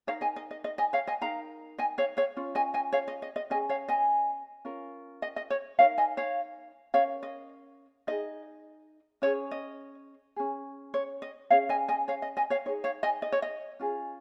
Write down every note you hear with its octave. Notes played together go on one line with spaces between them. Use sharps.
D#4 A#4 C#5 F5
D#5 G#5
D#5
D#5
D#5
D#5 G#5
C#5 F5
D#5 G#5
D#4 A#4 F5 A#5
D#5 G#5
C#5 F5
C#5 F5
C#4 F4
D#5 G#5
D#5 G#5
C#5 F5
D#5
D#5
D#5
C#4 G#4 D#5 G#5
C#5 F5
D#5 G#5
C#4 F4 A#4
D#5
D#5
C#5
D#4 A#4 C#5 F5
D#5 G#5
C#5 F5
C#4 A#4 C#5 F5
D#5
D#4 G#4 D#5
C#4 G#4 C#5
D#5
C#4 G#4
C#5
D#5
C#4 G#4 C#5 F5
D#5 G#5
D#5 G#5
C#5 F5
D#5
D#5 G#5
C#5 F5
D#4 G#4 C#5
C#5 F5
D#5 G#5
D#5
C#5
D#5
C#4 F4 G#4